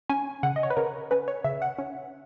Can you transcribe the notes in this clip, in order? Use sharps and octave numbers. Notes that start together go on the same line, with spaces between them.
C#4 G#5
C#3 F#5
D#5
C#5
B4
C#3 A#4
C#4 B4
C#5
C#3 E5
F#5
C#4